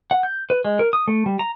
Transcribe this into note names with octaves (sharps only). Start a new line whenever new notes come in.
F#5
G6
B4
G#3
A#4
D#6
A3
G3
A#5